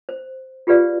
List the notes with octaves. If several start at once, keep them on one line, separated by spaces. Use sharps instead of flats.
C5
F4 G4 G#4 B4 D5 F5